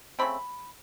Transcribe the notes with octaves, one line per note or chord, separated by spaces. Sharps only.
C#3 F#3 A3 C4 B5